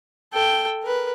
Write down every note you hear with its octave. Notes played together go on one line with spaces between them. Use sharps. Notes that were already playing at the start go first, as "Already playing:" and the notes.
A4 G5
A#4 B4